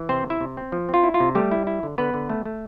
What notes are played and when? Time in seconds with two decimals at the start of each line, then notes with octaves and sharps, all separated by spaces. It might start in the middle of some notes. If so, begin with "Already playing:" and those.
Already playing: E3
0.09 C3 C4 C5
0.26 C3 E4 E5
0.41 C3
0.57 C4
0.72 F3
0.89 C4 F4
1.03 E4
1.14 F4
1.20 C3
1.35 G3 A3 G4
1.51 E4
1.67 E4
1.83 D3
1.98 D3 B3 B4
2.14 D3
2.29 A3
2.45 A3